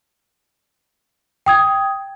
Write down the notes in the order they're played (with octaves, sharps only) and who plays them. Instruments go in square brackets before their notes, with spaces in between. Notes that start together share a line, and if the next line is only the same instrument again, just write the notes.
[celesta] G5 D#6 G#6